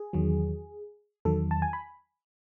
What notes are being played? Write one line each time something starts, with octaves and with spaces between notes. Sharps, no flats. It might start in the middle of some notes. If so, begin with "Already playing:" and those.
Already playing: G#4
E2 D#3 F#3
E2 D#3 F#3 A4
A5
G#5
B5